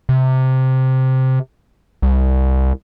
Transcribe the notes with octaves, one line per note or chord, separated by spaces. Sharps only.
C3
C2